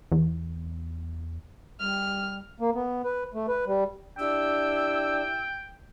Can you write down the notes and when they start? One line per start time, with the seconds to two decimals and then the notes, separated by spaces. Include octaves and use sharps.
0.12 E2
1.79 G3 F6
2.60 A#3
2.75 B3
3.04 B4
3.34 A3
3.48 B4
3.67 G3
4.18 D4 E4 G4 G5 E6